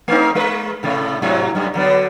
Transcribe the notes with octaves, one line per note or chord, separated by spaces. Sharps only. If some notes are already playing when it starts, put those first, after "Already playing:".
A3 C4 D#4
G#3 A#4 B4
A2 C3 A3
G#2 C3 F#3
F#2 A2 G3
D3 F#3 B3